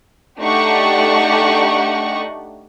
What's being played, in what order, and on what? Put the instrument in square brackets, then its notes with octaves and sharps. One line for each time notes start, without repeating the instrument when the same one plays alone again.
[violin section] A3 D4 D#4 G4 F#5 C#6